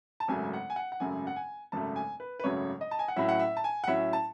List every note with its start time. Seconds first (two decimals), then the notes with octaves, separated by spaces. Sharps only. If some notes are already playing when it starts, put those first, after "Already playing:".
0.20 A5
0.28 G#1 F#2 C#3 F#3 A3 G#5
0.53 F#5
0.70 G#5
0.76 F#5
0.92 F#5
1.00 G#1 F#2 C#3 F#3 A3 G#5
1.27 F#5
1.36 G#5
1.72 G#1 F#2 C#3 F#3 A3 A5
1.96 G#5
2.20 B4
2.40 B4
2.44 G#1 F#2 C#3 F#3 A3 C#5
2.81 D#5
2.91 A5
2.99 G#5
3.08 F#5
3.16 A2 F#3 C#4 E4 E5
3.29 F#5
3.40 E5
3.57 A5
3.64 G#5
3.84 F#5
3.87 A2 F#3 C#4 E4 E5
4.13 A5